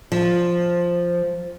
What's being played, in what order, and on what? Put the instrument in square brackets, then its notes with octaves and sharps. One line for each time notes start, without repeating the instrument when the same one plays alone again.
[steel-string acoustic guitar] F3